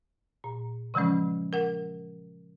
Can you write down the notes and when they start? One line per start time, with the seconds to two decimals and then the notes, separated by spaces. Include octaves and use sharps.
0.44 A#2
0.94 C#3 E3 F3 G#3 C#4
1.53 A#4 F#5